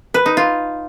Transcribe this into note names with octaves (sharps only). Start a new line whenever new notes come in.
B4
D#4
F4